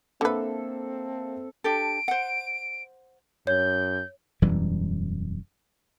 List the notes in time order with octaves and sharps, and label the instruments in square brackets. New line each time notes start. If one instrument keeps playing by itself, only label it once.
[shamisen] D3 B4 [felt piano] A#3 E5 [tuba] C4 [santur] A4
[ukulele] D4 G4 A4 [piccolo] D7
[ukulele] C5 F#5
[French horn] F#2 [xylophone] C#5 [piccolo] G6
[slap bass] E1 F#2 E3 G3